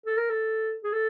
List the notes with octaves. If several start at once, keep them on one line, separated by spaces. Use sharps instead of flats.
A4
A#4
A4
G#4
A4